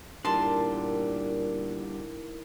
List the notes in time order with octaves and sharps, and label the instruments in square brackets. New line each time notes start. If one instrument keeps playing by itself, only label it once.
[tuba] A#2 [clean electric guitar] D3 G3 [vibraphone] D#4 E4 A#4 [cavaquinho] A5 C6